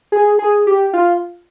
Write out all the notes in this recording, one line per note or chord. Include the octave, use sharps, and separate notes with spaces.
G#4
G#4
G4
F4